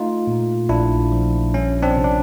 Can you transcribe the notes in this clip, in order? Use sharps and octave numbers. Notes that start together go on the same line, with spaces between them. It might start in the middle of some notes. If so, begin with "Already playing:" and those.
Already playing: A3 D#4 F4
A#2
A#1 D4 E4
F3
G3 C#4
C4 D4
C3
D4